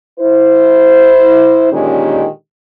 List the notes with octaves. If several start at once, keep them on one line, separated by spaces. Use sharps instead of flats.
E4 C5
A#2 D3 D#3 G#3 C#4 G4